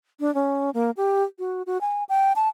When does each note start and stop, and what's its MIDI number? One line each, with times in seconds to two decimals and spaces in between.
0.20 0.33 62
0.35 0.70 61
0.74 0.91 58
0.97 1.23 67
1.39 1.63 66
1.67 1.80 66
1.81 2.04 80
2.09 2.33 79
2.36 2.49 81